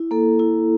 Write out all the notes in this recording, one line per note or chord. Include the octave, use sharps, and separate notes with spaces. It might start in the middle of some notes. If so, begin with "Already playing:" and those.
Already playing: E4
A#3 A4
E4